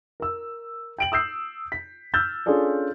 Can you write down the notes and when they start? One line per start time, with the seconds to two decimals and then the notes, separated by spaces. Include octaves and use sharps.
0.20 A#4 E6
0.98 G5 D7 F#7
1.12 D#6 E6 G6 C7
1.72 B6
2.14 E6 F6 G6 A6
2.46 C#4 D4 F4 G#4 A4 D5